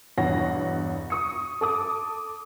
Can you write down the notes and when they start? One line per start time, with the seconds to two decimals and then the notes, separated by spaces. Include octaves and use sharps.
0.17 E2 G2 B2 C#5 F#5 A#6
1.10 C#6 D#6 C#7
1.61 A4 D6 D#6